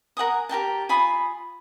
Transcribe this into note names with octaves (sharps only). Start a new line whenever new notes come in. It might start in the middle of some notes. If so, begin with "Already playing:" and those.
A#4 F#5 G#5 D#6
G4 A#4 G5 A5
F4 G#5 B5 D#6